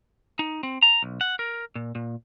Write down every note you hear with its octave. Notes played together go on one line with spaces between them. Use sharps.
D#4
C4
A#5
B1
F#5
A#4
A#2
A#2